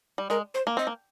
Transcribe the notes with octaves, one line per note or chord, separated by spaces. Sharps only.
G3
G#3 A#4
C5
A#3
C4 D#5
A#3